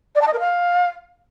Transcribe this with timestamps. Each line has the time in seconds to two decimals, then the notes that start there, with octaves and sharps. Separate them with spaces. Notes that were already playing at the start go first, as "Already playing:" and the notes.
0.15 D5
0.21 A5
0.27 D#5
0.33 A#4
0.39 F5